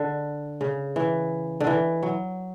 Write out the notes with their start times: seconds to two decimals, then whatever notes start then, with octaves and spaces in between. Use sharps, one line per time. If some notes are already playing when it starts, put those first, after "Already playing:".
Already playing: D3
0.61 C#3
0.96 E3
1.60 D3
1.67 E3
2.03 F#3